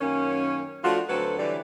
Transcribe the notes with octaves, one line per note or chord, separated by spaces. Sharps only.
F#2 D#3 A#3 C#4
F3 A3 D4 F4 F#4
D2 F#3 C4 A4 B4
D3 E3 F#3 G3 G4 D5